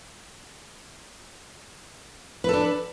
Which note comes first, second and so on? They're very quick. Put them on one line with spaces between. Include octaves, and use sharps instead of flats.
B4 A4 D4